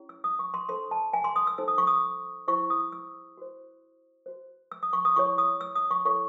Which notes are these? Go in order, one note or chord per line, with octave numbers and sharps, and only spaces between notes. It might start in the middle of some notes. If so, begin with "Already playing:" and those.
Already playing: C#4 E4 G#4 C#5
E6
D#6
C#6
C6
D#4 A4 C5 C6
A5
G#5
C6
D#6
E6
D#4 A4 C5 E6
D#6
C#6
D#6
E4 G#4 C5 C#6
D#6
E6
F#4 C5
F#4 C5
E6
D#6
C#6
D#6
E4 G#4 C#5 C#6
D#6
E6
D#6
C#6
E4 A4 C#5 C#6